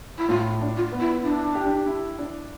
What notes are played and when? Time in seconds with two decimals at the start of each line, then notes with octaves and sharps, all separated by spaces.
0.18 E4
0.29 A2 F4
0.61 D4
0.77 F4
0.92 B3
1.00 E4
1.23 D4 E4
1.55 G4
1.86 E4
2.18 D4